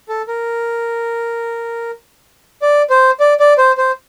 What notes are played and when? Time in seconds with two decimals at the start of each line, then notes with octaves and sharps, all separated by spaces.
0.09 A4
0.28 A#4
2.62 D5
2.90 C5
3.20 D5
3.40 D5
3.58 C5
3.78 C5